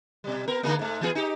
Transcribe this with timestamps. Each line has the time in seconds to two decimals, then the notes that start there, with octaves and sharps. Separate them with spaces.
0.24 B2 G3
0.48 B3 A#4
0.63 D3 G#3 A#3
0.79 G#2 A3
1.01 E3 B3 G#4
1.15 D#4 G4